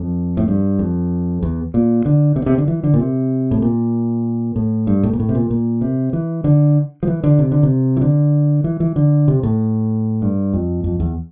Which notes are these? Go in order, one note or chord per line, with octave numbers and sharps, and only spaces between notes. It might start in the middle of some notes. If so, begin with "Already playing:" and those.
Already playing: F2
A2
G2
F2
E2
A#2
D3
C3
D3
C3
D3
E3
D3
A#2
C3
A2
A#2
A2
G2
A2
A#2
A2
C3
A#2
A#2
C3
E3
D3
F3
E3
D3
C3
D3
C3
E3
D3
E3
E3
D3
C3
A2
G2
F2
F2
E2